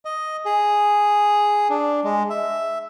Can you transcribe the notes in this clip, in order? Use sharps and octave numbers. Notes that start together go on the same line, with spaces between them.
D#5
G#4
D4
G#3
E5